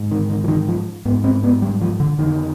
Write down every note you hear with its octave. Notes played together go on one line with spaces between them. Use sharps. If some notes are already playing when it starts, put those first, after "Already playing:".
Already playing: G#2
D#3
D#3
F3
D#3
F3
G#2 B3
C4
B3
G3
F3
D3
F2 D3 D#3